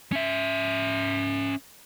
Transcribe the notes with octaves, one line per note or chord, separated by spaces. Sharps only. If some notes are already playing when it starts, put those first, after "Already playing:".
C#4 E5